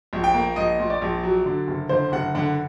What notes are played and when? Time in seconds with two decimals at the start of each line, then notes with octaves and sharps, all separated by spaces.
0.13 A#1
0.24 G5
0.34 A#3
0.56 A#1 D#5
0.79 A#2
0.90 D5
1.02 A#1
1.24 F#3
1.46 D3
1.68 F#1
1.89 D3 C5
2.12 F#1 F#5
2.35 D3 F#5